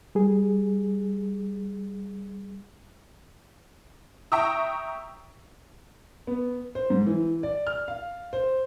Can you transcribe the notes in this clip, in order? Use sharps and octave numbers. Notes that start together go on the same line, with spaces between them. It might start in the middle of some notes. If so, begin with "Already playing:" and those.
G3 G#4
E5 G5 A#5 C#6 D#6 E6
B3
C5
G#2
E3
D5
F6
F5
C5